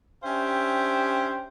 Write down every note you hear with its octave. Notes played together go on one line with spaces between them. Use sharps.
C#4 D4 G4 C5 E5 G5